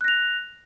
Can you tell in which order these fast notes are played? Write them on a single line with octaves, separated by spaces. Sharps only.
F#6 A#6 F7